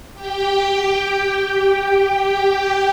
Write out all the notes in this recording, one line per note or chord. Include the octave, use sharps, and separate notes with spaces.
G4 G5